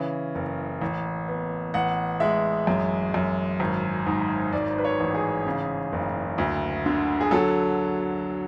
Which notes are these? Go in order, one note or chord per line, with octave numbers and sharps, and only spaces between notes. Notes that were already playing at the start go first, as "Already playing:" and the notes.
Already playing: C#3 E3
F#1
A1
B3
A1 F#5
G#3 E5
F#2
F#2
G#1
G#2
G#2 D5
B4
C#5
A1
G#4
C#3
F#1
D2
D3
G#4
F#3 A4